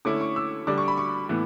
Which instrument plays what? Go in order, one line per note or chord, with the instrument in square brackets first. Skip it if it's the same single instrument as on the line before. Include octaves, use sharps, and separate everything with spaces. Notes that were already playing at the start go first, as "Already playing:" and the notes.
[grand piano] D3 A3 C#4 E4 [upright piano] D6
[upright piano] C#6
E6
[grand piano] D3 G3 D4 [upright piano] D6
[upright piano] C#6
B5
C#6
[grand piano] A2 E3 B3 E4